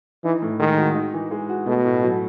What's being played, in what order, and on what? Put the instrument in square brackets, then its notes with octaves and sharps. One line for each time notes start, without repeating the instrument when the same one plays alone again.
[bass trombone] E3 [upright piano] D#4
[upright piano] A2
[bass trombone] D#3 [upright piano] G#3
[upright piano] F#4
D#4
E3
G#3
F#4
[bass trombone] B2 [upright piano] A3
[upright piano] A2
F#3